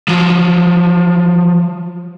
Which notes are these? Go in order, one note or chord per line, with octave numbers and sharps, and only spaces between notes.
F3 F#3